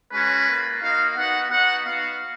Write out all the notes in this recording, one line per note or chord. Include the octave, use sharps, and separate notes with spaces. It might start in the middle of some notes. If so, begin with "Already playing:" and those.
G#3 C#4 F#4 B4
A#3 F4
A#3 D#4 F#4 F5
B3 D#4 F#4 F#5
B3 D#4 F#4 F#5
B3 F#4 F5